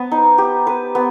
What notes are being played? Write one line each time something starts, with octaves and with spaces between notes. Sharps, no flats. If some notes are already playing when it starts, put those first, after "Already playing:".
Already playing: B3 B4
D#4
G4
B4
B3